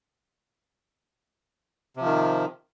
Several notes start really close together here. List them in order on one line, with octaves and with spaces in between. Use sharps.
C3 F3 D#3